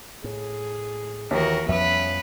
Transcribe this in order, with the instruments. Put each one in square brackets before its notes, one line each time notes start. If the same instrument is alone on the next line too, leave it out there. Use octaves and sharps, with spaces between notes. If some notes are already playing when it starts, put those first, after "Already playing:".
[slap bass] A2 [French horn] G#4
[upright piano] D#2 D#3 E3 [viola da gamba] F#4 A#4
[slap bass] F2 F3 G3 [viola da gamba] B3 B4 [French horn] C#4 [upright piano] E5